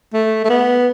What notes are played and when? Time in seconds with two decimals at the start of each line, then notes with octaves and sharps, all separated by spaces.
0.13 A3
0.45 A3
0.50 B3